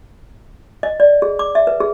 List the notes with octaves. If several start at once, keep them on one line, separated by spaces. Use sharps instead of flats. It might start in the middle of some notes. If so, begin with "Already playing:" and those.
D#5
D5
G#4
D6
E5
B4
G#4